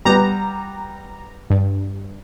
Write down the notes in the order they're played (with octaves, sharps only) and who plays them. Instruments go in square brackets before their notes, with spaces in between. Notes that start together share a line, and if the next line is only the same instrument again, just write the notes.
[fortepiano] G3 B3 [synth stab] A#5
[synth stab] G2